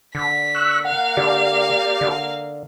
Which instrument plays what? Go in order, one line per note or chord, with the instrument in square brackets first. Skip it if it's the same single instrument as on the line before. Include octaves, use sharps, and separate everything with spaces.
[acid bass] D3 [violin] B6
[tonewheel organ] C#6 E6 F#6
[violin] A#3 F5 [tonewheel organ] F#5
[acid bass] D3 [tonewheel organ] G4 D5
[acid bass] D3